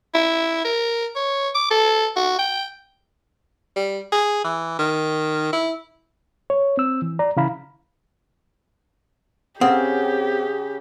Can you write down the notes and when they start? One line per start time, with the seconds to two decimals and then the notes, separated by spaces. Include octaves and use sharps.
0.14 E4
0.64 A#4
1.15 C#5
1.54 D6
1.70 A4
2.16 F#4
2.38 G5
3.76 G3
4.12 G#4
4.44 E3
4.79 D#3
5.53 E4
6.50 C#5
6.77 C4 E6
7.02 E3
7.19 D5 A#5
7.37 C#3 E3 E4 F5 A#5 B5
9.61 C#3 C4 G4 A4 B4 F#5